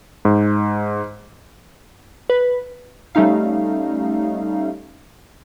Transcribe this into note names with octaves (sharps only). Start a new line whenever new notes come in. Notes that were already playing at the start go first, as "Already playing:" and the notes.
G#2
B4
G3 A3 C#4 D#4 F5